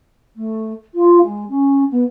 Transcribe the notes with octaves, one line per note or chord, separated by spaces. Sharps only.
A3
F4
G#3
C#4
B3